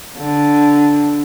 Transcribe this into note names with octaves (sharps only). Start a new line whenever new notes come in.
D3